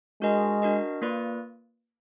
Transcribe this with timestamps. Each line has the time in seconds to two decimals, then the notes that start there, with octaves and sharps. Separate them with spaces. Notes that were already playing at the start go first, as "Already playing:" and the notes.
0.22 G#3 D4 F#4 A#4 D#5
0.62 D4 F#4 A#4 D#5
1.02 A#3 F4 B4 D5